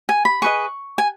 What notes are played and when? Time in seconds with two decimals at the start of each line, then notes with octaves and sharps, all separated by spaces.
0.09 G#5
0.25 B5
0.42 G#4 B4 D#5 C#6
0.98 G#5